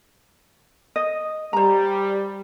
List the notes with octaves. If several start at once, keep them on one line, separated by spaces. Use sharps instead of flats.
D#5
G3 C5 A#5